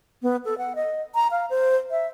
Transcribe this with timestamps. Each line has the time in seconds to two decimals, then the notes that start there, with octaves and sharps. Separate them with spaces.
0.23 B3
0.45 A4
0.58 F#5
0.76 D#5
1.15 A#5
1.31 F5
1.50 C5
1.91 E5